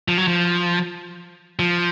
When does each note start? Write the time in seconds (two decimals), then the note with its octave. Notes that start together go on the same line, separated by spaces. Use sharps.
0.08 F3
0.18 F#3
0.28 F3
1.59 F3